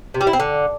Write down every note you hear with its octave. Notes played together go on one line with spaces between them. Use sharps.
C3
G3
E4
C4
D3